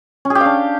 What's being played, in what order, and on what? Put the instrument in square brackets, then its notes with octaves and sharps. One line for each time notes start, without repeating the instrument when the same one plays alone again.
[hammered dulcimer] C#4
G#4
G4
F5
D4